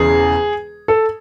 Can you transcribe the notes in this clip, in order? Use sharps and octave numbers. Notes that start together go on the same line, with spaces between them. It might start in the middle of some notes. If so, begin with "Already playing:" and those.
Already playing: E1 E2 C#3 G#4
A4